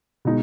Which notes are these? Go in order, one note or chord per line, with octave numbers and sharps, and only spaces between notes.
B2 G#3 D#4